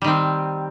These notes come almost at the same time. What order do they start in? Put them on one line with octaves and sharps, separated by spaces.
G3 D#3 C4